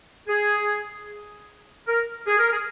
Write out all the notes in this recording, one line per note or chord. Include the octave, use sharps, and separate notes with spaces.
G#4
A#4
G#4
A#4
G#4